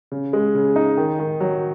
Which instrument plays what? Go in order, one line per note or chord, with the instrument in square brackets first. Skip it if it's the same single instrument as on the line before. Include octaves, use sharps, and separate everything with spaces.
[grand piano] C#3
G#3
C#3
D#4
D#3
D#3
F#3